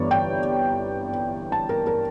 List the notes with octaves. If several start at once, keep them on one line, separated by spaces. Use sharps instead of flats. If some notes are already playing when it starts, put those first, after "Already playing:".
Already playing: G1 G2 E3 C#5 D5
G5
A5
A#4
A#4